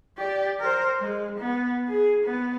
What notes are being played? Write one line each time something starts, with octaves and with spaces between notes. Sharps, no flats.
G4 D5
A#4 C5
G#3
B3
G#4
B3